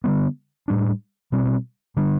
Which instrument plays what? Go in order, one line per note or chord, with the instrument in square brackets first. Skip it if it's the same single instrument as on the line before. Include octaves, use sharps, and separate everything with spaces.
[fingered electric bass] D3 G3 B3
A2 G3 D4
B2 G3 C4
D3 G3 D4